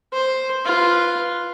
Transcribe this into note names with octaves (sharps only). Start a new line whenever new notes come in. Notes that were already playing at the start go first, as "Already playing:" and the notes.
C5
F4 B4